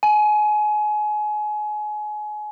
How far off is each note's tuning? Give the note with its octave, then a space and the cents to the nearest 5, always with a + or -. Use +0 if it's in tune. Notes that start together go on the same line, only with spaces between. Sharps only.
G#5 +30